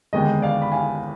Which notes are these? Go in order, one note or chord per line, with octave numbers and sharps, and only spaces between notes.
F1 D#2 D3 G#3 B3 D#5 G5
D5 F5
B5
F5 G#5